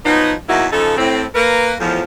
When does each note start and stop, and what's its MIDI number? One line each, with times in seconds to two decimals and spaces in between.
0.06 0.33 53
0.06 0.33 54
0.06 0.33 59
0.06 0.33 63
0.49 0.66 40
0.49 0.66 54
0.49 0.66 58
0.49 0.66 63
0.49 0.66 64
0.49 0.66 66
0.72 0.94 49
0.72 0.94 53
0.72 0.94 63
0.72 0.94 69
0.98 1.24 45
0.98 1.24 60
1.35 1.75 58
1.35 1.75 70
1.35 1.75 71
1.80 2.03 40
1.80 2.03 45
1.80 2.03 53